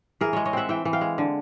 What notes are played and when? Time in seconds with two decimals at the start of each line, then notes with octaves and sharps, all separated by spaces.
0.21 E3 G#4 A#4
0.33 G#3 C#5 D#5
0.45 C#5 D#5
0.53 C4 E5 F#5
0.69 E3 G5
0.85 E3
0.93 F5 G5
1.01 G#3
1.18 D3